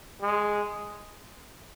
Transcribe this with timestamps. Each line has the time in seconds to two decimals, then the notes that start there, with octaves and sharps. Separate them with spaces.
0.22 G#3